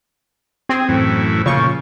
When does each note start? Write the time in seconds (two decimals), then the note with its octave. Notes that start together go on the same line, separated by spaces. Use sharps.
0.69 C4 G#4
0.89 F#2 A2 E3
1.46 A#2 C#3 F3 C#6